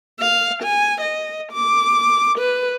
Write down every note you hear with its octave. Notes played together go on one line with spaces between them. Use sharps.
F5
G#5
D#5
D6
B4